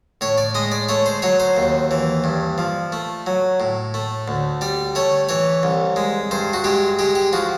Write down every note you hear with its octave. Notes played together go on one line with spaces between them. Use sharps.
A2 C#5
D5
G#3 D#5
D5
A3 C#5
C5
F#3 C#5
C5
D#2
E3
G2
F3
A3
F#3
A2
A3
D2
G3 D5
A3 C#5
E3 C#5
C2
G#3
G2 C5
F#4
G#3 G4
G#3 G4
G4
F3 F#4